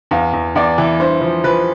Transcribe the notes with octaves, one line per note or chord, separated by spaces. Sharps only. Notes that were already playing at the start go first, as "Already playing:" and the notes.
E2 F5
E2
E2 D5
E3
G2 C5
F3
F3 B4